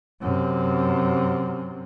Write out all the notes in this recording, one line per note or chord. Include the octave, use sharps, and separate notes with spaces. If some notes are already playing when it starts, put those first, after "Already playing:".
F#2 C3